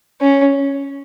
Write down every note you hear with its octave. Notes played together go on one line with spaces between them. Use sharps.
C#4